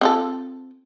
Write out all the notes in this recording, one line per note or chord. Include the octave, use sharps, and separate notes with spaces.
C4 F4 A4